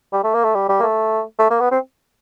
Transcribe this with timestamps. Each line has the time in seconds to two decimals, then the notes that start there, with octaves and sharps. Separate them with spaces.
0.13 G3
0.24 A3
0.34 A#3
0.44 A3
0.55 G3
0.69 G3
0.80 A#3
0.82 A3
1.39 A3
1.50 A#3
1.60 B3
1.71 C4